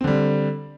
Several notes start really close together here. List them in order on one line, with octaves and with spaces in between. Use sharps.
C4 D3 G3